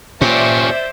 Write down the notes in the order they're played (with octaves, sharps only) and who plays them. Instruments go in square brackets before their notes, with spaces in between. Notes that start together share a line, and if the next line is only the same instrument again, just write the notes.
[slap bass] A#2 [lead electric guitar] C#4 G4 [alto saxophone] C5 [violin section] D5 E5